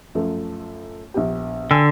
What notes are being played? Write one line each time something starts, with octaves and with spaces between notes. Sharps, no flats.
F#2 F3 A3
A#1 B3 G4
D3 G5 G#5 E6